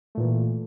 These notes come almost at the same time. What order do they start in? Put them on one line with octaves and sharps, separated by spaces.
A3 A#2 E3